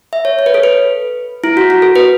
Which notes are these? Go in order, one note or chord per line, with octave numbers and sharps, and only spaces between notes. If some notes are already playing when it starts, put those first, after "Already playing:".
E5
C#5
C#5
B4
A4
B4
E4
F#4
F#4
A4
B4